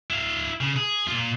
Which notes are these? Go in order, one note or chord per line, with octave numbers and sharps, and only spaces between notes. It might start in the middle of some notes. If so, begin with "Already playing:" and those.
E4 F5
C#3
G#4
A#2 F4